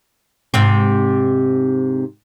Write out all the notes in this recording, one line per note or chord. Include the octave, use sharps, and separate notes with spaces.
G#2 C3 C4